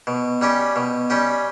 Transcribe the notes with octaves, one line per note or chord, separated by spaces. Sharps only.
B2
G3 C#4 G4
B2
G3 C#4 G4